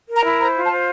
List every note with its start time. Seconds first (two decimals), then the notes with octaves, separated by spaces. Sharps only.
0.09 A#4
0.16 A#5
0.24 E4
0.39 C5 A#5
0.56 F4
0.63 A5
0.71 C5